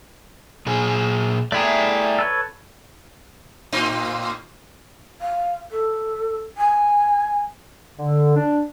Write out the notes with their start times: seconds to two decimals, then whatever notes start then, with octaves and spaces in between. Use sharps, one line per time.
0.66 A#2 G#4
1.52 A3 E4 G#4 D5 G5 A#5
2.19 A4 B4 C#5
3.72 A2 C4 D#4
5.20 F5
5.70 A4
6.57 G#5
7.99 D3
8.36 D4